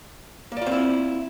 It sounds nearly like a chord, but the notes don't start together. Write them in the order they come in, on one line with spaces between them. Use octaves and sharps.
A#3 D5 F4 C4 E4